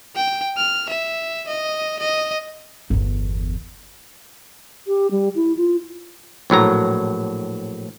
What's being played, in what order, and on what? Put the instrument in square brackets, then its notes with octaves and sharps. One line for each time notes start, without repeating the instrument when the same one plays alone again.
[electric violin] G5
F6
E5
D#5
D#5
[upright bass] G1 E2
[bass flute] G4
G3
E4
F4
[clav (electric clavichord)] A#1 A2 F#3 A#5